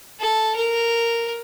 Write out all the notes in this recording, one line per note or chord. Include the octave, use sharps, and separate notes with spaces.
A4
A#4